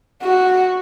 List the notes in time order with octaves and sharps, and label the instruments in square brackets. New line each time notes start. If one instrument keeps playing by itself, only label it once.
[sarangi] F#4